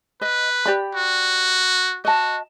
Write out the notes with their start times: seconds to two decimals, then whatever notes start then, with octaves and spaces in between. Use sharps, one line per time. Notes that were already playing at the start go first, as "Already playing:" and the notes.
0.21 B4 D#5
0.66 G4 D5 B5
0.95 F#4
2.05 F#4 D#5 A5